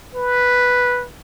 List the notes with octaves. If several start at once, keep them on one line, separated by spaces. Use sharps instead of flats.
B4